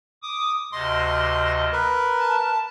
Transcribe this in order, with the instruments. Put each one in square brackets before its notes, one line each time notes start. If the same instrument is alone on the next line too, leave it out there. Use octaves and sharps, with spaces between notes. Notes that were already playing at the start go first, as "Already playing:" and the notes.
[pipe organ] D6 D#6
[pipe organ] D2 C3 D#5 [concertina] C6
[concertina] A#4 B4
[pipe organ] A5